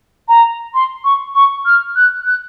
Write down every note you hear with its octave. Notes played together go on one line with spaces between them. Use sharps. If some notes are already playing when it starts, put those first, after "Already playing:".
A#5
C6
C#6
C#6
F6
F#6
F#6